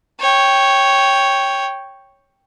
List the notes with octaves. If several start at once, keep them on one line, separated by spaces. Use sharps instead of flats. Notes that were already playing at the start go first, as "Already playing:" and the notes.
C#5 G5